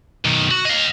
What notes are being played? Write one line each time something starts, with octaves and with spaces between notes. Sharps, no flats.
B1 D#3
F#4
D#5 F5